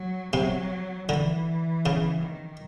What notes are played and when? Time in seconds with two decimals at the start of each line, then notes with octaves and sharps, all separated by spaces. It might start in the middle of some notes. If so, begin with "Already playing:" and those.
Already playing: F#3
0.33 C3 F#3
1.09 D3 E3
1.86 C#3
2.22 D#3